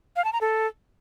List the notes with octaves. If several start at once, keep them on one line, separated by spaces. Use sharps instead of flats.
F5
A5
A#5
A4